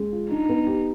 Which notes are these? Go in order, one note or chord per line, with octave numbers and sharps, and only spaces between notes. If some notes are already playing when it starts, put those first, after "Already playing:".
Already playing: G#3
F4
D4 D#4
B3
G4